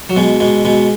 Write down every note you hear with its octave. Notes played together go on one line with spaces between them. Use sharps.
F#3
B2 G#3
B2 G#3
B2 G#3